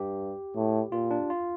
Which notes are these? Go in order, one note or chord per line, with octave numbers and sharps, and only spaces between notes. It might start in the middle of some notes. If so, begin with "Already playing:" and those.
Already playing: G2 G4
A2
A#2 F4
D4
F4